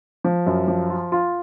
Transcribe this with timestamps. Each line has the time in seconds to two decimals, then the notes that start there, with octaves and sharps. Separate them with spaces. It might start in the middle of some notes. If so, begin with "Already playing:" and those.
0.24 F3
0.46 F#2
0.68 F3
0.90 F4
1.12 F4